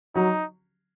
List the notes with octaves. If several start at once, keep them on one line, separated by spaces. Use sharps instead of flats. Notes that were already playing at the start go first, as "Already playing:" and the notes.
F#3 D#4